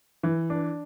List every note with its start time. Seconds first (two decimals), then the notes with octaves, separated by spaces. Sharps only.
0.23 E3
0.50 D4